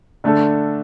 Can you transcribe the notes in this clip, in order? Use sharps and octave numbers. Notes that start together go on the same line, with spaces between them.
D3 A3 D4 A4